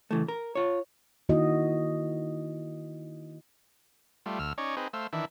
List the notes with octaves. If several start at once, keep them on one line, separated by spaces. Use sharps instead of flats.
C#3 E3 A3
A#4
F4 C#5
D#3 A#3 E4 F#4 D#5
G3 A3 F4
D2 E6 F6
C#4 D#4 C#5 D5
C4 D#4 G#4 B4
A3 C5 F5 E6
D#3 E3 D4 E5